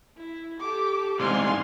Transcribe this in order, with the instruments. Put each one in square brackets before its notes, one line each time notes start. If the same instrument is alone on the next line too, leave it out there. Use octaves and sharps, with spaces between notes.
[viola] E4
[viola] G4 A4 [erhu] D6
[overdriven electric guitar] C2 G#2 [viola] F5 G#5 [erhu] C6